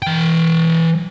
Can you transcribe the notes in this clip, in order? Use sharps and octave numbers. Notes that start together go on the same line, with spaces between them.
E3 G5